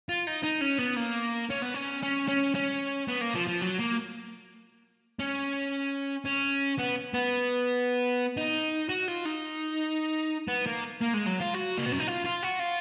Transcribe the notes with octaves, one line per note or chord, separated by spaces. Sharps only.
F4
D#4
D#4
C#4
B3
A#3
C#4
B3
C#4
C#4
C#4
C#4
B3
A#3
F3
F3
F#3
A#3
C#4
C#4
B3
B3
D#4
F#4
F4
D#4
B3
A#3
A#3
G#3
F#3
F4
F#4
A#3
B3
C#4
D#4
F4
F4
F#4
F4